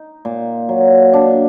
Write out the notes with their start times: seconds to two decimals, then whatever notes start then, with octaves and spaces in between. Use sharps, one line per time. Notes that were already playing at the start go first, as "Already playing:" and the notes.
Already playing: D#4
0.25 A#2
0.69 F#3
1.13 D4